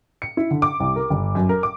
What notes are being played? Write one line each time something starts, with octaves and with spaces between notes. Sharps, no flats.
C#7
E4
D3
D6
C2
A#4
G1
F#2
A#4
D6